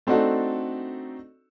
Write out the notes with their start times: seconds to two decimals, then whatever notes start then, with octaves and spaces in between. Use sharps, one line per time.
0.07 A3 C4 D4 D#4 F#4 A4